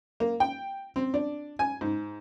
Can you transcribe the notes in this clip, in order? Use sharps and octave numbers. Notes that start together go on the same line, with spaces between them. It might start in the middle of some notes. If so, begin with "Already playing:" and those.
A#3
G5
C4
D4
G#5
G#2